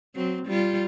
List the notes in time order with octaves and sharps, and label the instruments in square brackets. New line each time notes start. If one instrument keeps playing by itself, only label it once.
[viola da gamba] F#3 C4
G3 F4